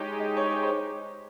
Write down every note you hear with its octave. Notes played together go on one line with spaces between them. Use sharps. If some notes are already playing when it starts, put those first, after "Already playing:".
Already playing: G#3 D#4 G4 C#5
D#5
C#5
C#5
C5